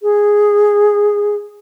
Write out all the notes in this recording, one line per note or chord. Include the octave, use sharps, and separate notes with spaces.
G#4